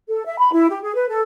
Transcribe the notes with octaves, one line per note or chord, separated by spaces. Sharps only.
A4
E5
B5
E4
G4
G#4
B4
A4